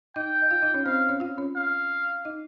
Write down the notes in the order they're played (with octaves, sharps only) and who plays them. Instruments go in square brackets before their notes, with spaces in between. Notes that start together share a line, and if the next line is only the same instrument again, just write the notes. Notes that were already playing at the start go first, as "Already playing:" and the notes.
[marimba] D#4 D#5 [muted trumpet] G5
[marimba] D#5
F4 F5
D#4 D#5
C#4 C#5
[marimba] C4 C5 [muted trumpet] F5
[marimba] C#4 C#5
F4 F5
C#4 C#5
[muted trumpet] F5
[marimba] D#4 D#5